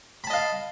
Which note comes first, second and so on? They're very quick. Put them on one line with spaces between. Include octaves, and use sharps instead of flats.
B5 A5 D#5 F5